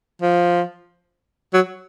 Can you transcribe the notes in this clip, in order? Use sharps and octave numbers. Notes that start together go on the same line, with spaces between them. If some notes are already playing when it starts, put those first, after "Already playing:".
F3
F#3